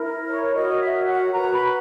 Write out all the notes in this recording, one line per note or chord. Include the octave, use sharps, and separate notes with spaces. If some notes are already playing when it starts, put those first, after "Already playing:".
Already playing: E4 A#4
C#5
F#4 A#4 C#5 D#5
E5
F#5
F#4 B4 A#5
B5